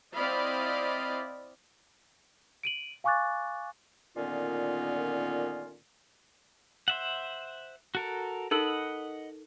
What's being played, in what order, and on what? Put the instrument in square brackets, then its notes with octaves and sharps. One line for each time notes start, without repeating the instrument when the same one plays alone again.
[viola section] C4 E4 D5 D#5 F5 B5
[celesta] D7 D#7 F#7
F5 G#5 C#6 D6 F#6 A6
[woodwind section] A#2 D3 D#3 B3 C#4 F4
[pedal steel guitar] C5 E5 F#5
F#4 A4 A#4
[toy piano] D#4 A4 A#4 [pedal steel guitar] D#5 F#5 B5